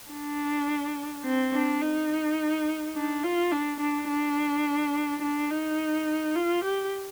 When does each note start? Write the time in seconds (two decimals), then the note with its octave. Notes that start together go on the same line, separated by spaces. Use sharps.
0.11 D4
1.25 C4
1.54 D4
1.81 D#4
2.95 D4
3.24 F4
3.52 D4
3.80 D4
4.09 D4
5.22 D4
5.51 D#4
6.36 F4
6.64 G4